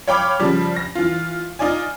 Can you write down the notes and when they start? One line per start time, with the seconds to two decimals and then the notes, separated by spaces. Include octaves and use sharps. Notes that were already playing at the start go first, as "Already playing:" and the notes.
0.07 C#5 F5 G5 B5 D6
0.40 C#3 F3 G3
0.76 A#6
0.95 E3 F4
1.59 D#4 F4 D5 G#5